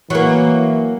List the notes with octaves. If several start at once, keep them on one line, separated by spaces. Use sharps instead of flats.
E3 F#3 A#3